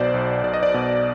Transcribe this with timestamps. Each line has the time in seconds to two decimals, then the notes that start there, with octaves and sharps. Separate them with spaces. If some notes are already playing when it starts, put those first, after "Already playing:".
Already playing: B1 B2 C5 D5
0.14 B1
0.44 B1 D5
0.54 D#5
0.63 D5
0.74 B2